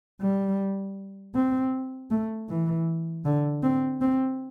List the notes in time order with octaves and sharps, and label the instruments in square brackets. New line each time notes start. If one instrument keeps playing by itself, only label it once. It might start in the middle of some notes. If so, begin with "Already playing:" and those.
[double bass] G3
C4
A3
E3
D3
C4
C4